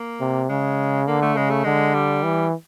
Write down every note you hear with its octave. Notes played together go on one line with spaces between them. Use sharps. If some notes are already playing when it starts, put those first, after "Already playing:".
Already playing: A#3
C3
C#3 G#3
D3 A#3
A3
C#3 G#3
A3
D3 G#3
G3
E3